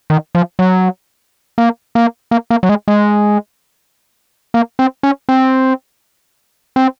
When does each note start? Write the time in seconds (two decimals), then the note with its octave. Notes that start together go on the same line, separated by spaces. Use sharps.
0.10 D#3
0.35 F3
0.59 F#3
1.58 A#3
1.95 A#3
2.31 A#3
2.50 A#3
2.63 F#3
2.69 G#3
2.88 G#3
4.54 A#3
4.79 C4
5.03 C#4
5.29 C4
6.76 C4